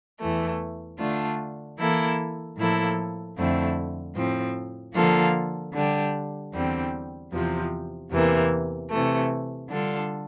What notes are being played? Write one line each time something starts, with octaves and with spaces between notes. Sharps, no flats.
E2 E3 A3
D3 A3 D4 F4
E3 A#3 E4 A4
A2 F3 A#3 E4 A4
F2 D3 A3 C4 E4
A2 F3 C4
D3 F3 A#3 F4 A4
D3 G3 D4 G4
E2 D3 G3 C4
E2 C3 F3
E2 C3 E3 A#3
C3 E3 A3
D3 G3 D4 F4 A4